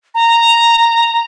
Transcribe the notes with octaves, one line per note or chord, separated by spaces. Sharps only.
A#5